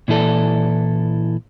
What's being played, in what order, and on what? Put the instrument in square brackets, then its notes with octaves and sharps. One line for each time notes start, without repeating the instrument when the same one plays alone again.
[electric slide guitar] A#2 E3 E4 A4 D5